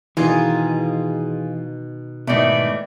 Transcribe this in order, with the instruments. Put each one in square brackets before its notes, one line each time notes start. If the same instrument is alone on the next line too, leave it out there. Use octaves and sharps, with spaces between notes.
[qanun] B2 D#3 [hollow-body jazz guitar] E3 [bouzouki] F4 G#4
[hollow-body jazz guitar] G#2 B2 [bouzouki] D#3 A3 [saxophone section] E3 D5